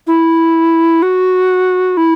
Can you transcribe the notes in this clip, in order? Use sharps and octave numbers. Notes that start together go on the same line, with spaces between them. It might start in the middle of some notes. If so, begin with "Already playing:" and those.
E4
F#4
E4